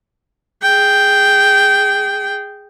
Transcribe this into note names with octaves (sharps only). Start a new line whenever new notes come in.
G#4 G5